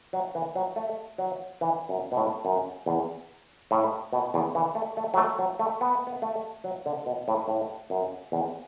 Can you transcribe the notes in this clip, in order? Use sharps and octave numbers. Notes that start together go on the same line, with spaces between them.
F#3
E3
F#3
A3
F#3
E3
F#2
B2
A2
F#2
E2
A2
B2
E2
E3
A3
A3
F#3
A3
F#3
A3
B3
B3
A3
F#3
D3
B2
A2
A2
F#2
E2